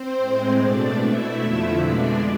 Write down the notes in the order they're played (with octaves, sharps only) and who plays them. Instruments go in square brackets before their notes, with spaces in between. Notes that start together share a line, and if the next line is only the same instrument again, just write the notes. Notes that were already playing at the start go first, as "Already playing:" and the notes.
Already playing: [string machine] C4 C5
A2 G#3
B2 A3 D4 D5
B2 A3 E4 E5
F2 D3 F3 A3
B2 G#3 D4 D5